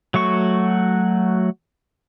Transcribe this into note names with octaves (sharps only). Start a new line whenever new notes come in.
F#3 A3 F#4 C#6